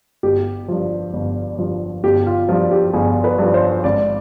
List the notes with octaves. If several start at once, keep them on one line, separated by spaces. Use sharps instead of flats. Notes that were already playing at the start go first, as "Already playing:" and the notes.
G1 G4
G2 F3
G1
G2 F3
G1 G4
F4
G2 F3 F4
G4
G1 G#4
B4
G2 F3
C5
G#1 D5